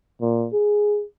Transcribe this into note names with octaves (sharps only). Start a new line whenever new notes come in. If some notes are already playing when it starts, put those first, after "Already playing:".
A#2
G#4